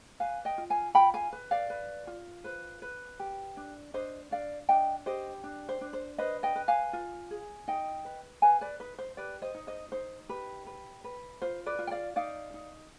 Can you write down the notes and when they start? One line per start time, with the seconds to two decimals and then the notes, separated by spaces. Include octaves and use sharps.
0.20 B4 F5 G#5
0.45 D#5 G5
0.58 F4
0.70 F5 G#5
0.95 F4 G5 B5
1.14 F5 G#5
1.33 B4
1.51 D5 F5
1.70 B4
2.07 F4
2.44 B4 C5
2.82 B4
3.20 G4
3.57 D4
3.94 D4 C5 D#5
4.31 D4 D5 F5
4.69 D4 D#5 G5
5.06 G4 C5 D#5
5.44 D4
5.69 C5
5.81 D4
5.93 C5
6.18 B4 C5 D#5
6.43 D#5 G5
6.56 B4
6.68 F5 G#5
6.93 F4
7.31 G#4
7.68 D#4 D#5 G5
8.05 B4
8.42 B4 F5 G#5
8.61 B4 D5
8.80 D#4 B4
8.99 C5
9.17 G4 B4 D5
9.42 C5 D#5
9.54 D#4
9.67 C5 D#5
9.92 D#4 C5
10.29 G4 B4
10.66 B4
11.04 B4
11.42 F4 C5
11.66 B4 D5
11.79 F4
11.87 G5
11.91 D5 F5
12.16 D#4 D5 F5
12.54 D#4